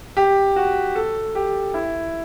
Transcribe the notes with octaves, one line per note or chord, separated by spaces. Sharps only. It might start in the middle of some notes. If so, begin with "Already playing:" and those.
G4
F#4
A4
G4
E4